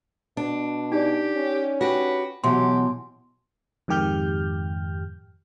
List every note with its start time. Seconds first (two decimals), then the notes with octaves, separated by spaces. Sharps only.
0.37 B2 D4
0.92 D#4 G4 D5
1.36 C#4
1.81 F#4 G4 B4
2.44 B2 E3 F#3 G4 C6
3.88 F2 G#2 D#3 G4 F6 G6